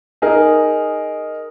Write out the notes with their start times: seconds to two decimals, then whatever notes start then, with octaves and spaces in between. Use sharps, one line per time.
0.22 D#4 G#4 A#4